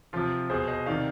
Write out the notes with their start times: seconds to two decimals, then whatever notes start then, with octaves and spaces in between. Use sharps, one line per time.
0.13 C3 F3 F4
0.50 B2 G#4 C5
0.68 C5 D#5
0.86 C3 D#3 D5 F5